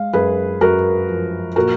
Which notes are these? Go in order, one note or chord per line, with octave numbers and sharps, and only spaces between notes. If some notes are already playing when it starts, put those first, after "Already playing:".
Already playing: G#3 F5
F#2 G#4 B4
F#2 F#4 A#4
F3
A#2 F#4 A#4